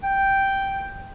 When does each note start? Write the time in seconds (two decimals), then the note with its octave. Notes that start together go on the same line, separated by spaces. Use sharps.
0.04 G5